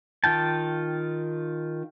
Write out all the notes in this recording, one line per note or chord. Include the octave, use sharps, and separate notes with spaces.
D#3 F4 G5 A5